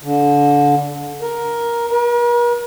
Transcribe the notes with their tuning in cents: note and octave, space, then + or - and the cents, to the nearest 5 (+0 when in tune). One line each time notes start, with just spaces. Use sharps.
D3 -25
A#4 +10
A#4 +45